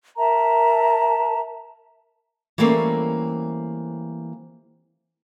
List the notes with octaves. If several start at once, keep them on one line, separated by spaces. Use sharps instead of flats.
A#4 E5 A5 A#5
E3 G3 A3 A#3 C4 C#4